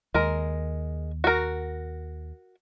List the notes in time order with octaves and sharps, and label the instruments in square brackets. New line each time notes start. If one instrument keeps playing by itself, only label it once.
[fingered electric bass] D#2 [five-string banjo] G#3 A#4
[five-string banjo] F#4 A#4